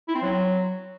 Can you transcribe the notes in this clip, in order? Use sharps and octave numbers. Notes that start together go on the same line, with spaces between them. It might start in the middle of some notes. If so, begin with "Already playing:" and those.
E4
C4
F#3